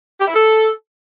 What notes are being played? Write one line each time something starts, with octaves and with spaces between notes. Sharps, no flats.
G4
E4
A4